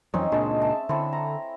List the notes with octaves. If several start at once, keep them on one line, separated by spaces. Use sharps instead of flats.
F2 E3 F#3 C4 C#4 D#4
C#2 A#2 G#3 D4 A5
E5 A5
D3 C4 E4 A4
A#5